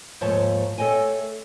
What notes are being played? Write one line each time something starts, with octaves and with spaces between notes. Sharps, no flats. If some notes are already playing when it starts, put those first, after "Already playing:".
D#2 G#2 F3 A3 C#5 A5
A3 A4 C#5 D#5 G5 G#5